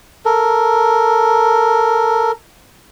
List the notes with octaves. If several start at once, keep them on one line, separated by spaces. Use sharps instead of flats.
A4 A#4